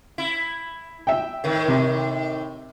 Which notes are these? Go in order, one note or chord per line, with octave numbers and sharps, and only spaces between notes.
E4
E5 G5
A2 D#3
C3